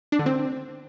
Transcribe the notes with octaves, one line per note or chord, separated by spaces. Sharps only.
D4
D3
C4